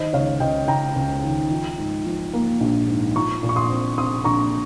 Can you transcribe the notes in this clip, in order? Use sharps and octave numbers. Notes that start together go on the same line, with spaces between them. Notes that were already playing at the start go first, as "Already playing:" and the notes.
Already playing: D#3 C5 D#5
C#2 C#5 F5
C#2 D#5 G5
C#2 G5 A#5
C#2
D#3
F3
G#2
F3
A#3
A#1
G#2
F3 A#5 C#6
A#2
C#6
C6 D#6
C4
C4 C6 D#6
A#1 A#5 C#6